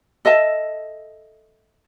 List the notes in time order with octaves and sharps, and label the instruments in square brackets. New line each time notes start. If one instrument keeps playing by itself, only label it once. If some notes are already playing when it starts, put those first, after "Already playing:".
[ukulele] A4 D#5 E5 A5